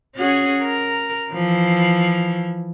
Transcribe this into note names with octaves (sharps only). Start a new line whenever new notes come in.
C#4 F#4 G#4
A#4
E3 F3